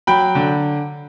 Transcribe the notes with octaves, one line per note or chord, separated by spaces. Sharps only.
F#3 G5 B5
D3